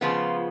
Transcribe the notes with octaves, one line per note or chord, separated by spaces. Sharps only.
C#3 F3 G#3 B3 F4